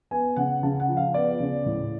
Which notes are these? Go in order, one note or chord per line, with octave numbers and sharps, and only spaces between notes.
B3 G#5
C#3 F#5
C#3 A5
F#5
F3
F5
B3 D5
C#3
A2